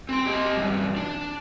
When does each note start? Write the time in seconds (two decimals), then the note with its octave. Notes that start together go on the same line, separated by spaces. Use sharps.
0.09 C4 C6
0.26 G4 D#5
0.56 E2 G2
0.97 D4